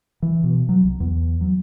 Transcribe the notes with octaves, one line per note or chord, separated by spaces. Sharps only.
E3
B2
F#3
C2
E2
F#3